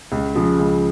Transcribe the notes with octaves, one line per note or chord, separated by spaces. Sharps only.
C#2
C#3 F3
C#2